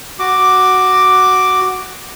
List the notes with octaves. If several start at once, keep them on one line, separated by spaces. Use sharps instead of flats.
F#4 D6